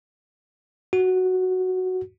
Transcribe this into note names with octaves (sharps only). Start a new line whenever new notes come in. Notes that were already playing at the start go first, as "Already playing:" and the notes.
F#4